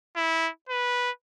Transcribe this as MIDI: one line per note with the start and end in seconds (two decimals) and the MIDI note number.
0.16 0.49 64
0.69 1.11 71